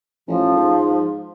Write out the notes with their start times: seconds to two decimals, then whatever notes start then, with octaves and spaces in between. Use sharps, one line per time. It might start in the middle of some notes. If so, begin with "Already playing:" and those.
0.28 A1 F3
0.55 G#2